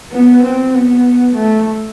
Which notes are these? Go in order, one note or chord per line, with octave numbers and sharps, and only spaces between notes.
B3
C4
B3
A3